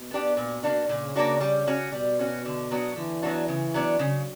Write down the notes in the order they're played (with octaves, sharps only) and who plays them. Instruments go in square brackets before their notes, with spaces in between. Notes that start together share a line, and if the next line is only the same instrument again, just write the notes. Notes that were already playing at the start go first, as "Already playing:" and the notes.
Already playing: [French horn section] B2
[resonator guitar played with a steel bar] B3 D4 G4
A#2
A#3 D4 F#4
[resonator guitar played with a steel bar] A#2 [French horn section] C#3
[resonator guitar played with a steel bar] A#3 D4 F#4
G3
C#4 F#4
[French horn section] B2 [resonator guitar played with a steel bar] G3
[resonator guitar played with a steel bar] C#4 F#4
D3
F#3 B3 D4 F#4
[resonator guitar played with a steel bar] D3 [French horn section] E3
[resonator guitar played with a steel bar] F#3 B3 D4 F#4
C#3
F#3 B3 D4
[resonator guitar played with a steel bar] C#3 [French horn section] F#3